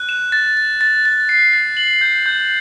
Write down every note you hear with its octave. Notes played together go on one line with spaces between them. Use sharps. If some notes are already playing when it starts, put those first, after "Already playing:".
Already playing: F#6
E7
A6
A6
A6
A6
C7
A6
F#7
G6
G6